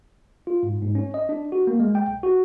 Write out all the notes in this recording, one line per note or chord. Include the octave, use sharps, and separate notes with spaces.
F4
G#2
G#2
C#4
D#5
D4
F#4
A#3
G#3
G5
B1
F#4